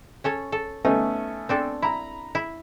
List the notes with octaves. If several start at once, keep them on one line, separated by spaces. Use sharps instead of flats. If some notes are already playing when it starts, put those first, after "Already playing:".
C#4 A4 C#5
A4
A3 B3 C#4 D#4
C4 D4 A4
E4 A#5 B5
E4